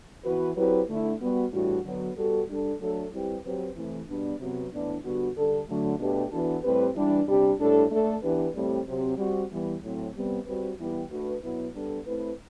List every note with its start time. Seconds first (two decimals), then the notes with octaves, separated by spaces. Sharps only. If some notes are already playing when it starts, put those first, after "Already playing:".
0.25 E3 B3 F#4 B4
0.56 F#3 C4 E4 G4 B4
0.88 D3 A3 E4
1.20 G3 B3 F#4
1.52 A2 E3 G3 D4 F#4
1.83 D3 F#3 B3
2.16 G3 B3 F#4 A4
2.48 G3 D4 A4
2.80 F#3 A3 D4 A4
3.12 G3 C4 E4 G4 B4
3.44 F#3 C4 G4 B4
3.75 C3 E3 A3
4.08 B2 G3 B3 D4
4.39 C3 F#3 B3
4.71 A2 E3 B3 D4
5.03 D3 G3 B3 F#4
5.36 D3 G3 D4 A4
5.68 D3 F#3 A3
5.99 B2 A3 D4 G4 B4
6.31 E3 B3 D4 F#4 A4
6.63 A2 G3 C4 G4 B4
6.95 E3 G3 D4
7.27 C3 G3 D4 G4
7.59 A2 G3 D4 A4
7.90 A3 D4 A4
8.23 E3 B3 D4 G4 B4
8.55 A2 G3 C4
8.86 C3 F#3 C4 G4
9.18 G3 C4 F#4
9.51 E3 G3 B3
9.82 A2 F#3 C4
10.14 C3 G3 B3
10.46 G3 C4 F#4 B4
10.78 E3 G3 B3 E4 G4
11.10 A3 D4 F#4 B4
11.42 B2 F#3 B3 E4 B4
11.74 G3 B3 D4 A4
12.06 A3 C4 E4 B4